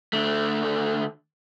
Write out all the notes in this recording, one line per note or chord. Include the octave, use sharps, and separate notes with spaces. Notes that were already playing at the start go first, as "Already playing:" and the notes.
D3 A3